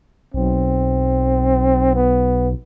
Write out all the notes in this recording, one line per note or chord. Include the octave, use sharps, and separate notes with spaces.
B1 C4
B3